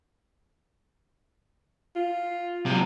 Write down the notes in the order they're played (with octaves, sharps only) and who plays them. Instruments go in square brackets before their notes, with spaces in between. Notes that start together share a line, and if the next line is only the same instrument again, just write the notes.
[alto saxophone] F4
[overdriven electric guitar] C3 F#3